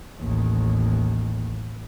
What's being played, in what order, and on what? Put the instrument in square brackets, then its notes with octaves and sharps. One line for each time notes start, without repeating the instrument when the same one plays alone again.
[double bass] A1 D#2